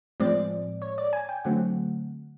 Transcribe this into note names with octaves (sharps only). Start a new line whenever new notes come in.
A2 F3 G#3 C4 D5
C#5
D5
G#5
G5
D3 F#3 A3 C4 F#5